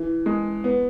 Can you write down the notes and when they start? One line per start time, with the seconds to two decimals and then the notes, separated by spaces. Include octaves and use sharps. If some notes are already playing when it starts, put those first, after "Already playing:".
Already playing: E3
0.26 G#3
0.64 B3